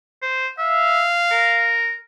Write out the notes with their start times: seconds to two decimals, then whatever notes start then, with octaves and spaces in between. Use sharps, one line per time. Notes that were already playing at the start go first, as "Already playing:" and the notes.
0.22 C5
0.58 E5 F5
1.31 A#4